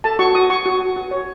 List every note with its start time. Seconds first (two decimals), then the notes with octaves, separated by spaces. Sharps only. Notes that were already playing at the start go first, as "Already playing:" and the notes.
0.04 A4 A5
0.19 F#4 C#6
0.35 F#4 D#6
0.50 F#4 C#6
0.66 F#4
0.80 F#4
0.96 F#4
1.11 C#5